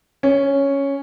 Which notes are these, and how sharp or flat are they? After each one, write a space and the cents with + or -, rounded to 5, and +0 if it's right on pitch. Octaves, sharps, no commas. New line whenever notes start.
C#4 +0